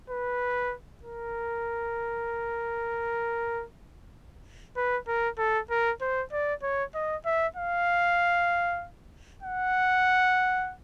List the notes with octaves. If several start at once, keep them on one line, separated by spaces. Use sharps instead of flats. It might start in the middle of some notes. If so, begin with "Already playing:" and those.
B4
A#4
B4
A#4
A4
A#4
C5
D5
C#5
D#5
E5
F5
F#5